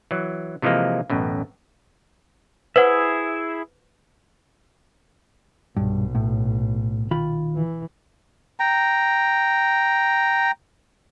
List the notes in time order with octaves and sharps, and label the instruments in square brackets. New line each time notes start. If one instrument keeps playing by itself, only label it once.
[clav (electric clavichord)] E3 F#3
C3 E3 F3 G#3 A#3
A1 F#2 B2
[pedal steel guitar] E4 G#4 E5 [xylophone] B4 C5 F#5
[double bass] B1 A#2 [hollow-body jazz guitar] G2
[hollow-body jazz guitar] A2
D#3 F4 B5
[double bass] E3
[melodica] G5 A#5